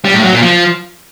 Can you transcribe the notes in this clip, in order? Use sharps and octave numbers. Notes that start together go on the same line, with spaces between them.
G3
A2
F#3
A#2
F3